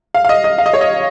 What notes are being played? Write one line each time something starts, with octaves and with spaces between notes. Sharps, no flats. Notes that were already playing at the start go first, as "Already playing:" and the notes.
F5
F5
D#5
D#5
F5
D#5
C#5
D#5